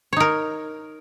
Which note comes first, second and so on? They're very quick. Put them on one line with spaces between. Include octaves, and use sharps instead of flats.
C#5 D#4 A#4